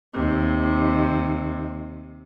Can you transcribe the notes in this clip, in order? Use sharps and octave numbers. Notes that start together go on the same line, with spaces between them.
D#2 C3